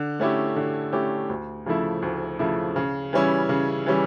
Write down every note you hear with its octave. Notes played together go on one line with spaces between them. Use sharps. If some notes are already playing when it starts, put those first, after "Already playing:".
Already playing: D3
A3 C#4 E4 G4
D3
A3 C#4 E4 G4
D2
C#3 F3 A3 E4
D2
C#3 F3 A3 E4
C#3
E3 G3 C#4 E4
C#3
E3 G3 C#4 E4